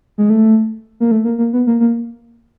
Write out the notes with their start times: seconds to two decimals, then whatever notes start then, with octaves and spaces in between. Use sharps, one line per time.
0.18 G#3
0.30 A3
1.00 A#3
1.11 A3
1.25 A#3
1.38 A#3
1.53 B3
1.67 A#3
1.80 A#3